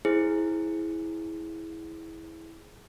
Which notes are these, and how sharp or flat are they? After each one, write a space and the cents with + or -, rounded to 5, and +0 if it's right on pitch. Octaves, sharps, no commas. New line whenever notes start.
E4 -15 G#4 +0 C5 +0